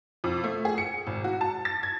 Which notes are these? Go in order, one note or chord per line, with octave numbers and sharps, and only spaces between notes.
F2
A3
G#4
C#7
G#1
F#4
A5
A6
G#6